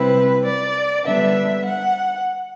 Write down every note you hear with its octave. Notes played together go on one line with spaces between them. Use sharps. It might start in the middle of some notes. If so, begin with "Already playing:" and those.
Already playing: C3 G3 C4 E4 B4
D5
D3 G3 B3 D4 E5
F#5